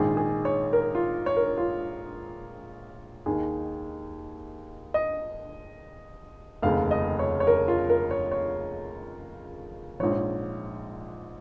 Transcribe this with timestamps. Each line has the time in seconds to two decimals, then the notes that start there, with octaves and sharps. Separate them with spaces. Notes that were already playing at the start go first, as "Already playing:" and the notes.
Already playing: A#1 G#2 D#3 G#4
0.17 G#4
0.45 C#5
0.73 A#4
0.95 F4
1.26 C#5
1.37 A#4
1.57 F4
3.26 D#2 D#3 G#4
4.94 D#5
6.62 F1 D#2 C#3 F5
6.91 D#5
7.19 C#5
7.40 C#5
7.47 A#4
7.68 F4
7.90 A#4
8.11 C#5
8.31 C#5
10.00 A#1 G#2 F3 C#5